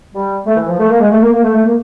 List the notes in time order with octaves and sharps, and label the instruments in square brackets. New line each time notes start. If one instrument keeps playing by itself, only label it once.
[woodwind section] G3
A3
E3
F3
A3
A#3
G#3
A3
A#3
A#3
A3
A3
A#3